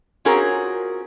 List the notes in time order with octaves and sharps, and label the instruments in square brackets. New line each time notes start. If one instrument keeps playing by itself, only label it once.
[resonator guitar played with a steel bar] C4 C#4 F4 F#4 G#4 A#4